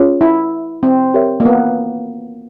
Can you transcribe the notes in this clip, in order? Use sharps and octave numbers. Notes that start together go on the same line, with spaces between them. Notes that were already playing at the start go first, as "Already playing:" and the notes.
Already playing: C#4 F4 G#4 C#5
E4
C4
G4 A#4 C#5 E5
A#3
B3